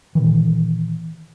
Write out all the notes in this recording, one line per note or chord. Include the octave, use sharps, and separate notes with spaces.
A#2 D#3 E3